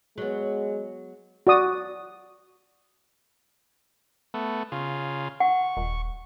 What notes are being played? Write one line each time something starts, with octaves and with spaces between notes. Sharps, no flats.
F#3 G#3 B3
F#4 D5 D#6
A3 B3
C#3 F4
F#5 C#6
D#1